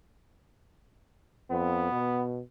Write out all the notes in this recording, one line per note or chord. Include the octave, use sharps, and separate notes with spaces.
F2 B3
B2